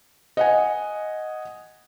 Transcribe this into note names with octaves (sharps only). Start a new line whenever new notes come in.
D#5 F#5 G#5